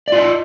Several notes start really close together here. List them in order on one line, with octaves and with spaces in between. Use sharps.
D5 F4 D#5